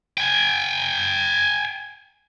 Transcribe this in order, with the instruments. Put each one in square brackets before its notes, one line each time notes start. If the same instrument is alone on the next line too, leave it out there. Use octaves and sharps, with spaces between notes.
[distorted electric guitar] G5 G#5